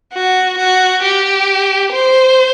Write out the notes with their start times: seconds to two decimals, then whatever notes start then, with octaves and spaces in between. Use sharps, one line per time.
0.13 F#4
0.58 F#4
1.03 G4
1.92 C5